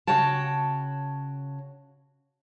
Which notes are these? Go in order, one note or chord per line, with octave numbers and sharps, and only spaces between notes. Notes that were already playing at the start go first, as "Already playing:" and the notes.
C#3 F#4 C#5 G5 A5